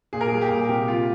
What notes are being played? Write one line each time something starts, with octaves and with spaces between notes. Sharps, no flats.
A#2 G#4
A#4
G3 G#4
G4
A#2
C3 G4
G3 F4